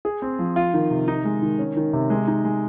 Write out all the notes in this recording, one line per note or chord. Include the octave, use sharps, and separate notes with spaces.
G#4
C4
F3
F4
D#3
C3
D#4
G#3
D#3
C#4
D#3
C3
G#3
D#4
G#3